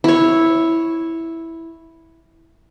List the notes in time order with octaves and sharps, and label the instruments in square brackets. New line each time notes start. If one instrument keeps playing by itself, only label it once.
[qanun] E4 C#5